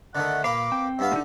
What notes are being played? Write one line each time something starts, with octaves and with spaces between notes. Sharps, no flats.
D3 D#3 A3 F#5
A#2 A#3 B4 F5 D6
C4 G5
G2 B3 E5 F5
A2 D3 D#4